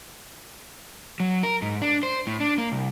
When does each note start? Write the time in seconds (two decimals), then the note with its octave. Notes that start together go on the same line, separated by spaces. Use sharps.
1.20 F#3
1.43 A#4
1.62 G#2
1.82 D4
2.03 C5
2.27 A2
2.40 D4
2.58 A#3
2.72 C2